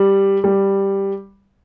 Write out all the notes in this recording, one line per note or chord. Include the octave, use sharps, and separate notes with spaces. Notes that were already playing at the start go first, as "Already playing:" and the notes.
Already playing: G3
G3